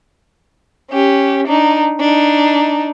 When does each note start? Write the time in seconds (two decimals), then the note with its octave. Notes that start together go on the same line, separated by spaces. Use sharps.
0.90 C#4 G4
1.47 D4 D#4
2.00 D4 D#4